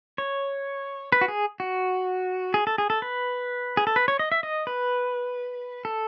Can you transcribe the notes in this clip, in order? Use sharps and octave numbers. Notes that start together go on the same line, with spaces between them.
C#5
B4
F#4
G#4
F#4
G#4
A4
G#4
A4
B4
G#4
A4
B4
C#5
D#5
E5
D#5
B4
A4